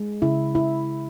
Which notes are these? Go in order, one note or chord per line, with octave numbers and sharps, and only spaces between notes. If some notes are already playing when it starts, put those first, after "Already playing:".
Already playing: G#3
C#3 E4
E4